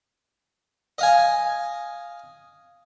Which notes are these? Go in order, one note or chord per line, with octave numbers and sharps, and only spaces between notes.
D#5 F5 G#5